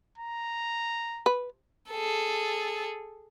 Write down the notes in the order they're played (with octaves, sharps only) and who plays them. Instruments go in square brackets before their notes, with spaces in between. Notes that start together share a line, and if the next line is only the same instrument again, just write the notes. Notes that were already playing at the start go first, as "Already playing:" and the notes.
[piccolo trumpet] A#5
[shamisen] B4
[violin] G#4 A4